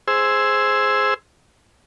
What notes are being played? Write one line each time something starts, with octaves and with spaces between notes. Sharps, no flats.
G#4 C5 E6